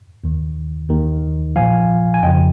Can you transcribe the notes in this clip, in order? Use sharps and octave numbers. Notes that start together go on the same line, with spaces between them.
D#2 D#3
D#2 D#3
A#1 A#2 F3 F5 G#5
G#5
F2 C#3 F3 D#5 G5